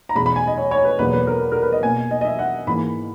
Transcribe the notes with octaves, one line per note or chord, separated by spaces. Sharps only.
A#5
E2 B2 G#3 B5
B5
G#5
D#5
C#5
C#5
B4
E2 B2 F#3 A#3 B4
B4
A#4
A#4
B4
D#5
B2 A#3 G#5
D#5
D#5
E5
F#5
G#2 E3 A#3 B5